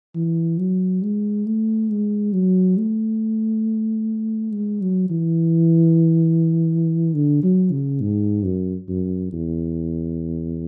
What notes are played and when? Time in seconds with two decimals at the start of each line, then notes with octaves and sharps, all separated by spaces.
0.15 E3
0.59 F#3
1.02 G#3
1.46 A3
1.90 G#3
2.33 F#3
2.78 A3
4.52 G#3
4.81 F#3
5.10 E3
7.14 D3
7.43 F#3
7.72 C#3
8.01 G#2
8.45 F#2
8.89 F#2
9.33 E2